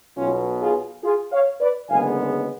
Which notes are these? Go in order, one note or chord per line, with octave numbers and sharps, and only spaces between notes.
B1 B2 F#3 C#4 F4
F4 G#4
F4 G#4
C#5 F5
B4 D5
F#1 F#2 D3 G#3 B3 F5 G#5